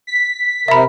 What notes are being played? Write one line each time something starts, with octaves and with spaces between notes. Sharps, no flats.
B6
C3 A#4 E5 B5